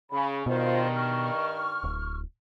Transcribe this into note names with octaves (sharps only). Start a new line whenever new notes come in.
C#3 B5
G2 B2 D#3 F4 C5
C#6 F6
D1